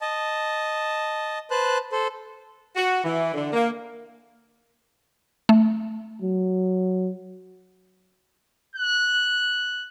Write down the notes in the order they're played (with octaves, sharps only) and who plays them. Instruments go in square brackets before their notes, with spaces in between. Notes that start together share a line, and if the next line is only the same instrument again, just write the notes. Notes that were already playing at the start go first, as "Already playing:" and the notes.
[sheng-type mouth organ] D#5 A5
B4 C5 A5 F#6
A4 C5
[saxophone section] F#4
E3
D3
A#3
[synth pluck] A3
[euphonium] F#3
[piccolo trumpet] F#6